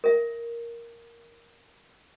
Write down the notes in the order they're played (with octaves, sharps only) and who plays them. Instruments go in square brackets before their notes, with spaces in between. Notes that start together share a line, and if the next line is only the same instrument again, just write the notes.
[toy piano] A#4 E5